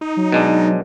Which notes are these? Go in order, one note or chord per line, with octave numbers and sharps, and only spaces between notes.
D#4
F#3
B2 G#3 D4